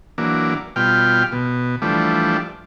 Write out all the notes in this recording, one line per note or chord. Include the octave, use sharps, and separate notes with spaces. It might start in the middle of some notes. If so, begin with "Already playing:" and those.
E3 F#3 A#3 D4
B2 G3 F4 G5 F6
B2
E3 F3 G3 A3 D4